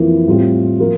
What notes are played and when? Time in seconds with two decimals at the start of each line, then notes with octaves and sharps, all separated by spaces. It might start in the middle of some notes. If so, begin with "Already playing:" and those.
Already playing: F2 E3 A#3 E4
0.27 A2 G3 C4 F4
0.79 F3 A#3 F4 A#4